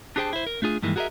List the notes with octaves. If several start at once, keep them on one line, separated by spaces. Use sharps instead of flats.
D4 G4 G#4 C5 G5 A5
E4 C5
A#4
A3 D4 F4 G#4
G2 D#3 E3 G#3 A#3
F#4 G#4 A#4 C5 D#5 E5